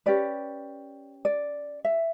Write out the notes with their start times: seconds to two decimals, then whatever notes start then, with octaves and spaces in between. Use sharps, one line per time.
0.06 C#4 G4 B4 D5
1.25 D5
1.85 E5